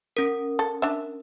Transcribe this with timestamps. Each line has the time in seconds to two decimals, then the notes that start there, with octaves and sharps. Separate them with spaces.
0.17 C#4 A#4
0.59 A4
0.82 D4 E5